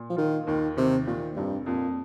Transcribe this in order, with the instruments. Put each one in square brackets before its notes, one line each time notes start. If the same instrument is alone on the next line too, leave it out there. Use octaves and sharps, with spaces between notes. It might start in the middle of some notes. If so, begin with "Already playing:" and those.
Already playing: [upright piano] A#2
[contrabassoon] F3
[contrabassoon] D#3 [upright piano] F4
[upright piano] D#2 [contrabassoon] D#3
[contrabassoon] C3 [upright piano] D#3
[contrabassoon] A#2 [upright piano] D#3
[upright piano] F1 [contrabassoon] G2
[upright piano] F2 [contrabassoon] A#2